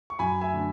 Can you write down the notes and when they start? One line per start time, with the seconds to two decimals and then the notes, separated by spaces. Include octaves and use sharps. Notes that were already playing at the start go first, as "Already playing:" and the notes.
0.10 C#6
0.19 F#2 G#5 B5
0.41 E5 G#5
0.53 D3 A3 D4